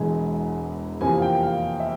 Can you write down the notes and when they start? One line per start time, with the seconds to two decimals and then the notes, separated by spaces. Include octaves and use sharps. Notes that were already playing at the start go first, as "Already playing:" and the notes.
Already playing: E1 E2 E3 G#3 G#5
1.01 F2 C3 E3 A#3 G#5
1.18 F5
1.22 G5
1.42 F5
1.80 E5